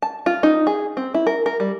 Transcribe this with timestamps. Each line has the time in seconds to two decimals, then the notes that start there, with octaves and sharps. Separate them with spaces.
0.02 A5
0.26 F4
0.43 D#4
0.67 G#4
0.97 C4
1.14 E4
1.27 A#4
1.46 A#4
1.60 G3